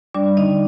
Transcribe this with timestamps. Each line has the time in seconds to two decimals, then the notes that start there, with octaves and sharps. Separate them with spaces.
0.14 G3 D4 D5
0.37 D3 D#4 D#5